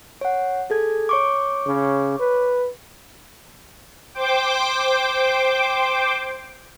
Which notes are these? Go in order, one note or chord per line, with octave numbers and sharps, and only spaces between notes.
C#5 F#5
G#4 A4 G#6
C#5 C#6 D6
C#3
B4
C5 G5 D6